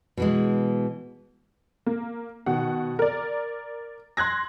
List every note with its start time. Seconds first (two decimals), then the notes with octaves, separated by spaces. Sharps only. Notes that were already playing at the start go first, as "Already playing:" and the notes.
0.17 B2 E3 G#3
1.86 A#3
2.46 B2 D#3 F#5
2.99 A#4 D5
4.17 C6 F#6 G#6 A#6